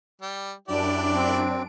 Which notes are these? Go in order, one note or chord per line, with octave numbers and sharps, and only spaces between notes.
G3 G5
F#2 D4 E4 G4 D5 D7
C4